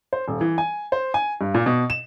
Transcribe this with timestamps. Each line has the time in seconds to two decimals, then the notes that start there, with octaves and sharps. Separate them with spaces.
0.13 C5
0.28 D#1
0.41 E3
0.58 G#5
0.92 C5
1.14 G#5
1.41 G2
1.54 A#2
1.66 B2
1.90 E7